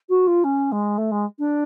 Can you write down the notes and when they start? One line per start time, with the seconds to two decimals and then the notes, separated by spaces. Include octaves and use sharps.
0.09 F#4
0.27 F4
0.44 C#4
0.72 G#3
0.98 A3
1.11 G#3
1.39 D4